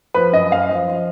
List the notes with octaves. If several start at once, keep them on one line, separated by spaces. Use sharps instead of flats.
F3 B4
F#2 D#5
F#2 F5
F3 D#5
F3